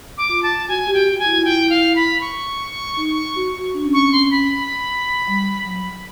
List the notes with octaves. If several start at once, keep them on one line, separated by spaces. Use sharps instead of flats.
D6
F4
A5
F#4 G#5
G4
G5
F#4
G#5
E4
F4
E4 G5
F5
B5
C#6
D#4
F#4
D4
C#4
C4 C#6
C#4
C6
B5
G3
F#3